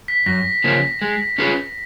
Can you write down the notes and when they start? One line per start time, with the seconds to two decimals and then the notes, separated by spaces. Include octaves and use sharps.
0.08 B6
0.26 F#2 A#6
0.64 C#3 F3 A#3 C#4
1.02 G#3
1.38 C#4 F4 G#4 B4